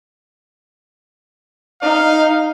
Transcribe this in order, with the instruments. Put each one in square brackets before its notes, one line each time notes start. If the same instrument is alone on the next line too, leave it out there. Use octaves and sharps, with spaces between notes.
[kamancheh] D#4 [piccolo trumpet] F5